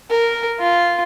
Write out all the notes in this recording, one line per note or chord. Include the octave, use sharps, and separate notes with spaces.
A#4
F4